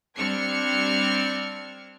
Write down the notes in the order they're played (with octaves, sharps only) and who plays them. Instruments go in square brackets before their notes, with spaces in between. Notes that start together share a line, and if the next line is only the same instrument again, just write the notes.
[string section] G3 C4 D4 F6 G#6 C#7